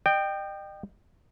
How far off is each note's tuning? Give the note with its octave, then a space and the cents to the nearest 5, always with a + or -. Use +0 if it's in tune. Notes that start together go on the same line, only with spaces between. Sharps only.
D#5 -35 G5 +0